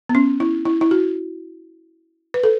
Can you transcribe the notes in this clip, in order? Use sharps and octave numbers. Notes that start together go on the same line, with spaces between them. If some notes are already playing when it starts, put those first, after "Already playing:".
B3
C#4
E4
E4
E4
F#4
B4
A4